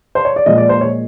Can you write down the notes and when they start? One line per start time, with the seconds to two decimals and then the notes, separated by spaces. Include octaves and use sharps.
0.15 C5
0.25 C#5
0.36 D5
0.46 A#2 F3 G#3 D#5
0.58 D5
0.69 C5
0.81 C#5